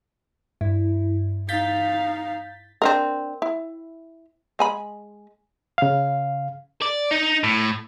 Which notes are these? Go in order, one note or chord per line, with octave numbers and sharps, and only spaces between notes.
G2 E4
D#4 F5 G6 A6 B6
C4 D4 A#4
E4
G#3 G#5 B5
C#3 F5
D5
D#4
A2